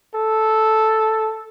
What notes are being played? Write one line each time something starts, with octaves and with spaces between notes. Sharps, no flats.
A4